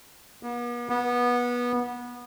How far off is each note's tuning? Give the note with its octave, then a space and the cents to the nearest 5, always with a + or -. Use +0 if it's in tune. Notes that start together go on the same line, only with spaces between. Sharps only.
B3 -45
B3 -20